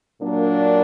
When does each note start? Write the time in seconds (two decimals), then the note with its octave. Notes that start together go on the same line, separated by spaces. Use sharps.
0.22 A#2 F#3 A#3 D4